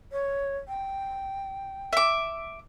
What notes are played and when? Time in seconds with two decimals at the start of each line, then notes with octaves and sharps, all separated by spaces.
0.12 C#5
0.68 G5
1.93 E5 D6